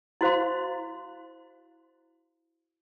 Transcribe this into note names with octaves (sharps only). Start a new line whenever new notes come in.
E4 F#4 C5 F5 C6